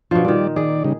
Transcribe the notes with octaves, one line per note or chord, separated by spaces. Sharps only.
B2 F3 D4
A#2 D#3 G3 D5
D#3 G#4 D5
C#3 G3 D#4